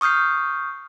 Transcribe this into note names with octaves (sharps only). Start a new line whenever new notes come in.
C#6 D#6 F6 G6 C7